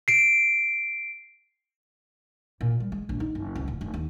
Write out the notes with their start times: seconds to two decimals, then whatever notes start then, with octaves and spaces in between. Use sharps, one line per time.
0.08 C7 D7
2.61 A#2
2.80 G3
2.92 G#3
3.09 A#1
3.20 D#4
3.35 F#1
3.55 C#2
3.68 D1
3.81 F1
3.94 D#2